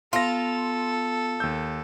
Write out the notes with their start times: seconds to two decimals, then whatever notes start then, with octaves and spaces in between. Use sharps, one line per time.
0.13 B3 F4 A4 C6 A#6
1.40 D#2 E6 G6